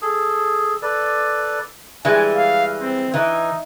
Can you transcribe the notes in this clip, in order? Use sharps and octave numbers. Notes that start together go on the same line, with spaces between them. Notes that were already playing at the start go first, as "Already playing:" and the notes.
G#4 A4
A4 B4 D5
E3 G3 G#3 G#5
F5
C4
E3 D#4